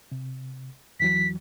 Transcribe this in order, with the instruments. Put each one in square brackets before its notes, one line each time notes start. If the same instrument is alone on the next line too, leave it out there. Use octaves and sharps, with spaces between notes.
[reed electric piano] C3
[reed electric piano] E2 E3 F#3 [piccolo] B6